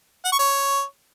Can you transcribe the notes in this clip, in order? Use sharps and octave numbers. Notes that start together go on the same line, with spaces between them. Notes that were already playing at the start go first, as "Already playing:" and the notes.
F#5
C#6
C#5